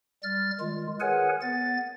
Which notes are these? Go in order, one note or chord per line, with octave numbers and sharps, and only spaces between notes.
G3 F6 A6
D#3 G#3 F4
G#4 A#4 B4 C#5 F#5 G#5
B3 A6